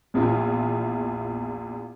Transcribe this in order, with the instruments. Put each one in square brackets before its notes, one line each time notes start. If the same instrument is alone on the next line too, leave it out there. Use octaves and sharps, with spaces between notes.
[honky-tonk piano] A#1 E2 E4 F4